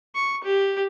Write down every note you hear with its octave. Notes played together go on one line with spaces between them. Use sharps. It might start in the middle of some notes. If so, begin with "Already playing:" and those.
C#6
G4